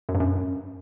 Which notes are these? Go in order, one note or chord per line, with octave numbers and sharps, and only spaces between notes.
F#2
G2
F#2